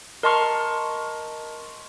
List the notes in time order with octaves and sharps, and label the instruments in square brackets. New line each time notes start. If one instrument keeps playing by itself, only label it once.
[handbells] A#4 D#5 A5 C6 C#6 F6